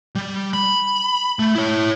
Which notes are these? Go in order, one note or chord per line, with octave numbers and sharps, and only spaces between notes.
G3
B5
A3
E4 C#5